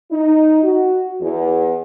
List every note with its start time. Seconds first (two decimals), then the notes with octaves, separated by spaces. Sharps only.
0.11 D#4
0.63 F#4
1.21 E2